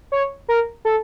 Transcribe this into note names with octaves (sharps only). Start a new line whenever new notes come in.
C#5
A#4
A4